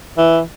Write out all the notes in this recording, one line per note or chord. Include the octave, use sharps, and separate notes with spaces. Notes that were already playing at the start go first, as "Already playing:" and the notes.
E3